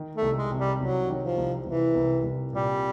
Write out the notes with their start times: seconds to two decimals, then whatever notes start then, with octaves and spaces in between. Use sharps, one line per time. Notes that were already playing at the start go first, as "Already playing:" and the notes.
Already playing: D#3
0.15 A3
0.22 C2
0.37 G#3
0.51 C3
0.58 G3
0.80 C2 F#3
1.08 D#3
1.23 F3
1.38 C2
1.66 C2 E3
1.95 C2
2.24 C2
2.53 A#2 G3